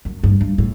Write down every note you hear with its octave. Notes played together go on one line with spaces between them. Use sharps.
F#2
G2
G2
A2